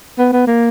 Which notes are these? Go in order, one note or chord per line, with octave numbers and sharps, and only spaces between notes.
B3
B3
A#3